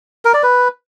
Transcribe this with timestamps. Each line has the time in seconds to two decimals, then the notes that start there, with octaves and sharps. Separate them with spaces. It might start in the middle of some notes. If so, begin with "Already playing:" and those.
0.25 A#4
0.34 D5
0.43 B4